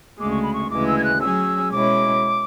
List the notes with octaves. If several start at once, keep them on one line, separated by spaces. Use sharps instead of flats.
D2 C#3 G#3 D6
C#6
B5
C#6
D2 C#3 E3 G#3 D6
E6
G#6
F#6
F#3 C#4 G#4 E6
B2 G#3 C#4 E4 D6